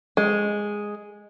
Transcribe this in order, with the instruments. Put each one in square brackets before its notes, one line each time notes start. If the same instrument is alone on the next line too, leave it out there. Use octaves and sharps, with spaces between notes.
[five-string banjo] G#3